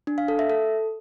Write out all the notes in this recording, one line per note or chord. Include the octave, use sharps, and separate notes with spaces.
D4
F5
A4
E5
A4